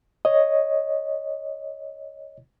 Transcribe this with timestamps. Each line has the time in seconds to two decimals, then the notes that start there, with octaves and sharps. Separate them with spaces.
0.25 C#5 D#5